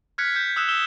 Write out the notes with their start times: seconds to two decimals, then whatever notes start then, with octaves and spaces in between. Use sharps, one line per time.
0.18 F6 F#6 G#6 B6 C#7
0.35 G6 C#7
0.56 D#6 E6 F#6 E7
0.69 E6 E7 G7